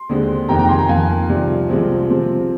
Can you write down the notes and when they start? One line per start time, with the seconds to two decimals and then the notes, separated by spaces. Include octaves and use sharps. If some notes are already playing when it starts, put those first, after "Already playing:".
Already playing: C6
0.09 D#2 D3 G#3 C4
0.49 F2 C3 D#3 G5 A#5
0.59 G5 A#5
0.69 G#5 C6
0.79 G5 A#5
0.89 F2 D#3 A#3 F5 G#5
1.29 C2 C3 F3
1.69 C2 C3 F3 G#3 C4
2.10 C3 F3 C4